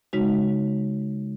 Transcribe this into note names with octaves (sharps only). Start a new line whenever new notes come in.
C#3 G#3 D#4 F#4